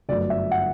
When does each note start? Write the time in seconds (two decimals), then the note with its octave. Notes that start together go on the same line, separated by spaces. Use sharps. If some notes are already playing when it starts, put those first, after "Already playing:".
0.09 G1 F#2 F#3 A3 D5
0.30 E5
0.51 F#5